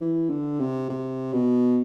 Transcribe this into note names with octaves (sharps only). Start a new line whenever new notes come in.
E3
D3
C3
C3
B2